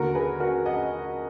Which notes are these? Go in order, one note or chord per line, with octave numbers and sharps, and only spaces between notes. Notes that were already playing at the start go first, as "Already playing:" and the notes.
Already playing: D#2 D3 F#4 A#4
G#4 B4
F#4 A#4
D#5 F#5